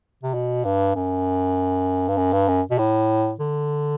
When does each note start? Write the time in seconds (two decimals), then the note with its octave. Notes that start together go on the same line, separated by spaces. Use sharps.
0.23 C3
0.34 B2
0.64 G2
0.95 F#2
2.08 G2
2.17 F#2
2.33 G2
2.48 F#2
2.71 B2
2.78 A2
3.40 D3